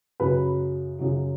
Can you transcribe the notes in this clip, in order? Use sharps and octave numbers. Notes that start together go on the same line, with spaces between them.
F#2 C#3 F#3 B4
F#2 C#3 F#3